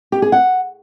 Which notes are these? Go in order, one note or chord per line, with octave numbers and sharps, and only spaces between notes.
G4
G#4
F#5